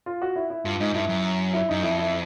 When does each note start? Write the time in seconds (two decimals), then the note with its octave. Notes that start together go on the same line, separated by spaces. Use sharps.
0.06 F4
0.22 F#4
0.36 E4
0.50 E4
0.65 G2 F4
0.80 G#2 D#4
0.94 G2 E4
1.09 F#2
1.53 E4
1.69 F#2 D#4
1.83 F2 E4
1.98 E4